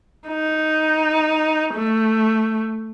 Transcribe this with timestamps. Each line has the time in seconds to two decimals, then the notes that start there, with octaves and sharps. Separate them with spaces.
0.28 D#4
1.74 A3